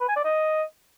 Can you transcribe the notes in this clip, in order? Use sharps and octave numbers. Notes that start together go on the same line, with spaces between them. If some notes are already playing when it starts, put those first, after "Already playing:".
B4
G#5
D5
D#5